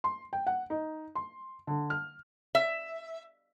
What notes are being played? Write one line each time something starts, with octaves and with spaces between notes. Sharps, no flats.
C6
G5
F#5
D#4
C6
D3
F6
E5